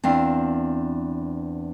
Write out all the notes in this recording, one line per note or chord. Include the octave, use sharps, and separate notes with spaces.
E2 C4 D4 F5